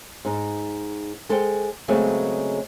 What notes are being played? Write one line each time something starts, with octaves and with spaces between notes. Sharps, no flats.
G#2 D#4
G#3 A4 C5 G5
C#3 F#3 G#3 A3 B3 C4